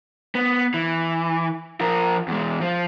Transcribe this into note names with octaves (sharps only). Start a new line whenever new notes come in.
B3
E3
F3 A#4
E2 G#3
F3